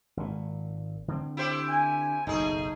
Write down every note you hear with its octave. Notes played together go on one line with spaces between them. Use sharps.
G#1 A#2
D3 C4
E4 G4 C5
G#5
F#1 B1 A3 D#4 G#4